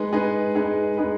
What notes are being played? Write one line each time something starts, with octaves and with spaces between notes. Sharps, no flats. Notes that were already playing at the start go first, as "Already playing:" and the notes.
Already playing: G#3 D#4 G#4 B4
G#3 D#4 G#4 B4
G#3 D#4 G#4 B4
G#3 D#4 G#4 B4